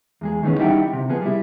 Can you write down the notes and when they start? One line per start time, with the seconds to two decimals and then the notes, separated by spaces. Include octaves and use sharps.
0.21 E2 G#3 G#4
0.43 D#3 E3 A#3 B3 C#4
0.59 G3 D#4 E4 E5 F#5 G5
0.93 C#2 C3
1.09 F3 B3 G#4
1.22 G3 E4